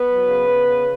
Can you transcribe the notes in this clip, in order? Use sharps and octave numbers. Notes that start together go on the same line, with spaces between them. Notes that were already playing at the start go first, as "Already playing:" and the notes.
Already playing: B3 B4
F#3
C#3
B3
C#3